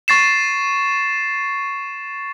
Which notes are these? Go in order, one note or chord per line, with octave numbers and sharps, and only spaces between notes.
C#6 A6 C7 E7